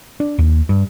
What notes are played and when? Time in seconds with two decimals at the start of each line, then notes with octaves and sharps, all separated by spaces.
0.20 D4
0.39 D#2
0.69 G2